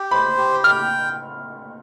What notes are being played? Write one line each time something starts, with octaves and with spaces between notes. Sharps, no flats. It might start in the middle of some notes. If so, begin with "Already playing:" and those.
Already playing: G4
C5 B5
G4
G5 F6